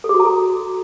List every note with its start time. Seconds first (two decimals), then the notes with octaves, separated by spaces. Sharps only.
0.04 A4
0.09 G#4
0.14 F#4
0.20 A#5
0.25 A4